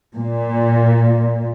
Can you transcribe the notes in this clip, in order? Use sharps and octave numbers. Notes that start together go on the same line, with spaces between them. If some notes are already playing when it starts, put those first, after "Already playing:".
A#2